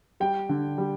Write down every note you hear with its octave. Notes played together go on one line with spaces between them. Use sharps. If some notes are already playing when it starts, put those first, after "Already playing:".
G3 G5
D3
G3